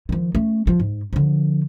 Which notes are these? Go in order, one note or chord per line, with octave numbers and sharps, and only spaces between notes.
D#3 F3
A3 C#4
F3
G#2
D3 F3